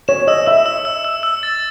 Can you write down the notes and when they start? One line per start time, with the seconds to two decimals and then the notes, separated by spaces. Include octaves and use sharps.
0.08 C#5 E7
0.27 D#5 E6
0.46 E5 E6
0.66 E6
0.85 E6
1.04 E6
1.23 E6
1.43 A6